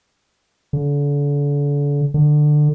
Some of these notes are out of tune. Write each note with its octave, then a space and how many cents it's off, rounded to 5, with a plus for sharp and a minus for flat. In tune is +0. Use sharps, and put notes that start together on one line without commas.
D3 -35
D3 +20